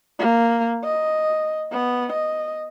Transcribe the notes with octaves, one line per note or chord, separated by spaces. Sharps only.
A#3
D#5
B3
D#5